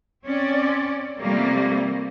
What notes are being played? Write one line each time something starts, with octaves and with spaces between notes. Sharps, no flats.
C4 C#4 D5
C3 F3 G3 A3 A#3